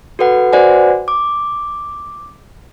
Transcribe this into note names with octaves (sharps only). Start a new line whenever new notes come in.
F#4 A4 B4 F#5
F#4 B4 C5 D5 F#5 G#5
D6